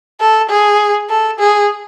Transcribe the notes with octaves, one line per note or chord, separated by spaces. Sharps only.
A4
G#4
A4
G#4